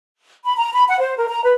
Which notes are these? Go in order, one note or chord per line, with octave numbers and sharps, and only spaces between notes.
B5
A#5
B5
F#5
C5
A#4
A#5
B4